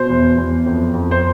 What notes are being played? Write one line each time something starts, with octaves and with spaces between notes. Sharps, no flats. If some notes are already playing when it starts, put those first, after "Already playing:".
Already playing: B2 C5
E2
E2
F2
F2
C5